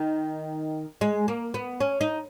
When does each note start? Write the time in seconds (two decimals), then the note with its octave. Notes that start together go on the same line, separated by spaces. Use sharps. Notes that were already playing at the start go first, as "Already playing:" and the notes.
Already playing: D#3
1.01 G#3
1.28 A#3
1.54 B3
1.80 C#4
2.01 D#4